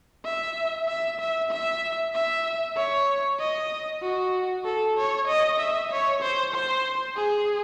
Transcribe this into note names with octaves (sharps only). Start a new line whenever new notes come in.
E5
E5
E5
E5
E5
C#5
D#5
F#4
A4
C#5
D#5
E5
C#5
C5
C5
G#4